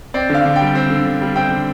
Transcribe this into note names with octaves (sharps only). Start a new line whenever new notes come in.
C4 D5
D3 F5
D3
G3 G5
C4
D3
D3
G3
C4 G5
D3